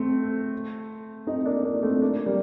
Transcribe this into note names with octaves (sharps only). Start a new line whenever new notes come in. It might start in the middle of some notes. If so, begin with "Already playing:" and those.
Already playing: A3 C4
C4 D#4
A#3 D4
A#3 D4
A3 C4
A#3 D4
G3 A#3